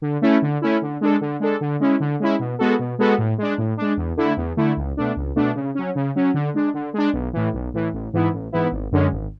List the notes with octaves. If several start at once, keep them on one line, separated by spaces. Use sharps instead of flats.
D3
A3 C#4 E4
D3
A3 C#4 E4
D3
G#3 D4 A4
D3
G#3 D4 A4
D3
G#3 C#4 E4
D3
G#3 C#4 E4
B2
G#3 B3 F#4 A4
B2
G#3 B3 F#4 A4
A2
G#3 D4
A2
G#3 D4
E2
D3 A3 E4
E2
D3 A3 E4
C#2
B2 A3 D4
C#2
B2 A3 D4
C#3
F#3 C#4
C#3
F#3 C#4
D3
G#3 D4
D3
G#3 D4
B1
A2 E3
B1
A2 E3
A1
G#2 E3 B3 E4
A1
G#2 E3 B3 E4
G#1
F#2 D3 G#3 C#4
G#1